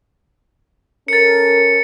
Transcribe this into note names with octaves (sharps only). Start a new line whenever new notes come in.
C#4 A4 A#4 A6 C#7